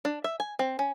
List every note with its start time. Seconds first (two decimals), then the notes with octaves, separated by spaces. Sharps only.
0.05 D4
0.24 E5
0.40 G#5
0.59 C4
0.79 C#4